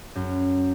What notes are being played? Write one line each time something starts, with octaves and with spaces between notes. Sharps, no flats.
F#2